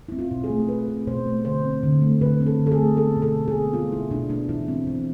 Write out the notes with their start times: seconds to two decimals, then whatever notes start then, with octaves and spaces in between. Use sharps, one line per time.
0.09 C4 E4
0.19 F4
0.31 B2
0.44 G#4
0.50 A3
0.69 B2 B4
0.88 C4
1.07 B2 C5
1.26 A3
1.45 D3 C5
1.64 C4
1.83 D3
2.02 A3
2.21 D3 B4
2.41 C4
2.46 A4
2.59 D3
2.66 A4
2.72 G#4
2.78 A3
2.97 B3 A4
3.17 B2
3.22 A4
3.35 B2
3.48 G#4
3.55 B3
3.73 B3 F4
3.92 B2 E4
4.11 B2 D4
4.30 B3 D4
4.49 E3 E4
4.68 C4
4.87 E3